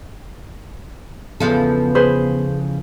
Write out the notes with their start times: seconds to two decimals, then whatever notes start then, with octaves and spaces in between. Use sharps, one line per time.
1.40 E2 C#3 F3 B3 A4
1.95 G#4 B4 C5